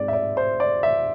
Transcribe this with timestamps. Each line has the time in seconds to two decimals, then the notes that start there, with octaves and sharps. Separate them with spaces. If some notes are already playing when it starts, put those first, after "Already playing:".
Already playing: G#2 G#3 C4 D5
0.08 E5
0.13 D5
0.37 C5
0.60 D5
0.83 E5